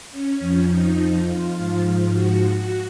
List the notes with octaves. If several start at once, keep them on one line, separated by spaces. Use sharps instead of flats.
C#4
F2 F3
D#4
F4
G#2 F3
F#4